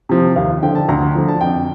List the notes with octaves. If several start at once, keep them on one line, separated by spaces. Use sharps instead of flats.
C3 F3
D#2 F5
D3 F3 G5
A5
D2 A#5
D3 F3
A5
F2 G5